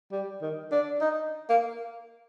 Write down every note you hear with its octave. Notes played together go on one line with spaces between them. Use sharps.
G3
D#3
D4
D#4
A#3